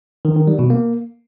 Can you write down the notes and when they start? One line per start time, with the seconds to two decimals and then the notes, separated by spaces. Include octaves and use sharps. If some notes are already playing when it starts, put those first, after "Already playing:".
0.25 D#3
0.36 D#3
0.47 G3
0.59 B2
0.70 A#3